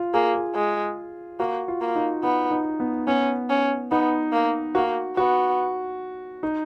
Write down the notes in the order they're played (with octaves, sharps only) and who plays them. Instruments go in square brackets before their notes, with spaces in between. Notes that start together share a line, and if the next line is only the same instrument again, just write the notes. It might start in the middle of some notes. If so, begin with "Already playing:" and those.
Already playing: [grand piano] F4
[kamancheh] A#3 [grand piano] G#4
[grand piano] G#4
[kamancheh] G#3
[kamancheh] A#3 [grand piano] F#4
[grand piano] F4
[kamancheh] A#3
[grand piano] D#4
[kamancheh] B3 [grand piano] D#4
[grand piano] D#4
B3
[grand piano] B3 [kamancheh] C#4
[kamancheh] C#4
[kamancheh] B3 [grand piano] D#4
[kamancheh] A#3
[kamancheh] A#3 [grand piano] F#4
[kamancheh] B3 [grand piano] F#4
[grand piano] D#4